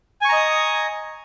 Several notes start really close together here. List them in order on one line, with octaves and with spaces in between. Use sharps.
G#5 C#6 A#5 D#5 D#6